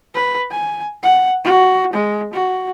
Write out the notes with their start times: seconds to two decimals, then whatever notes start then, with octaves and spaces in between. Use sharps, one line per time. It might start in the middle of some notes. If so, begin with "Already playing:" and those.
0.15 B4
0.51 G#5
1.03 F#5
1.44 F#4
1.93 G#3
2.33 F#4